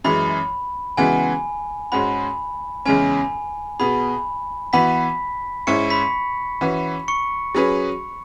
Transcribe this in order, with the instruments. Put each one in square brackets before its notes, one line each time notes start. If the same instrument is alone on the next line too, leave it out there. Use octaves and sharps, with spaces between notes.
[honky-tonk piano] F#2 E3 G#3 [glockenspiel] B5
[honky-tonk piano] C#3 E3 G#3 B3 F#4 [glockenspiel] G#5
[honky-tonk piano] G#2 G#3 C#4 F#4 [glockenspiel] B5
[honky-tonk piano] E2 C#3 G#3 C#4 [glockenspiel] G#5
[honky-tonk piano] B2 B3 G#4 [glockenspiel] B5
[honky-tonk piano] E3 B3 F#4 B4 [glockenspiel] B5 B6
[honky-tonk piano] G#2 G#3 C#4 E4 [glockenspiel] C#6 C#7
[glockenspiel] B5 B6
[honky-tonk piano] E3 C#4 F#4 B4
[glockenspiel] C#6 C#7
[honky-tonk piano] F#3 C#4 G#4 B4